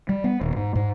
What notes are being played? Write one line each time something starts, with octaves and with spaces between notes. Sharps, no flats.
G3
B3
D#1
G#2
G#2